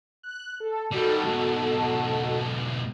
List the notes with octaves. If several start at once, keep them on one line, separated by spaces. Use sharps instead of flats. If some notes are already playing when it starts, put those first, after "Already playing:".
F#6
A4
D#3 G3 D#4 F#4 A4
G#2 B2